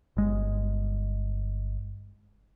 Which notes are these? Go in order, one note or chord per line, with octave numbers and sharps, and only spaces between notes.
G1 G#3